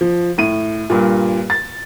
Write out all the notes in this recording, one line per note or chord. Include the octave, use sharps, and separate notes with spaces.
F3
A2 D#7
G2 A#2
A6